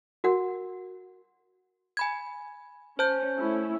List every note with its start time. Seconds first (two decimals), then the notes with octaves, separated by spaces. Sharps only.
0.24 F#4 A#4 F#5
1.97 G#5 B5 G#6
2.99 C#4 C5 A5 G6
3.37 A3 C#4 E4